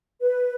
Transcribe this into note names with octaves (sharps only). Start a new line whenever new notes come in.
B4